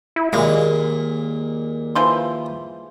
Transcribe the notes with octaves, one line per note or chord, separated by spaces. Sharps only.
E4
D#2 A#2 G#3 F5
E3 F3 C6